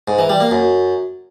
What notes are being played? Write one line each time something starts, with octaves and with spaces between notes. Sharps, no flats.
G#2
E3
G3
A#3
F#2